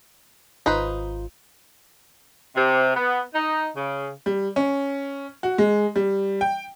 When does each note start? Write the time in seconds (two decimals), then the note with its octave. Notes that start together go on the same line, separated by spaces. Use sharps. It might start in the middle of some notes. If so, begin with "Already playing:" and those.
0.66 G#1 D#4 F4 B4 C5
2.56 C3
2.96 B3
3.34 D#4
3.76 C#3
4.26 G3
4.56 C#4
5.43 F#4
5.58 G#3
5.96 G3
6.41 G5